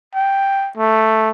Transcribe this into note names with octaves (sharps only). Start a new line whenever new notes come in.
G5
A3